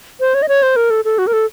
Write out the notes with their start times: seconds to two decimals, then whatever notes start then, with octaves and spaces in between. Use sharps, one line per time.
0.20 C5
0.34 C#5
0.42 D#5
0.49 C#5
0.63 C5
0.76 A#4
0.90 A4
1.05 A4
1.18 F#4
1.27 A#4
1.33 A4